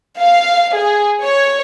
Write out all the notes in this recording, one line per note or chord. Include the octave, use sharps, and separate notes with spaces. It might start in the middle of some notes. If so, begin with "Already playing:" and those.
F5
G#4
C#5